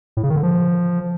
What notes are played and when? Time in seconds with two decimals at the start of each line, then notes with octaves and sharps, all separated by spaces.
0.17 A2
0.23 C#3
0.30 D#3
0.36 D3
0.43 F3